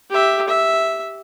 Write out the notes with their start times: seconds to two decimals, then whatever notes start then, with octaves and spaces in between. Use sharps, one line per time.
0.10 G4 E5
0.48 E5